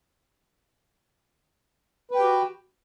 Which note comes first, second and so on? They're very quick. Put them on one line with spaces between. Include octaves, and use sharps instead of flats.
B4 G5 G4 F#4